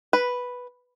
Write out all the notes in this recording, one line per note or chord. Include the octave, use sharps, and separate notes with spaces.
B4